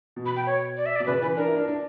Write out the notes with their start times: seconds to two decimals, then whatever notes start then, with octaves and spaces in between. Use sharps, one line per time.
0.16 B2
0.26 B5
0.32 B2 G5
0.46 C#5
0.77 D5
0.86 E5
0.96 D5
1.00 B2
1.07 C#3 B4
1.22 E3 B4
1.36 D4 A#4
1.48 E4
1.57 D4
1.68 D4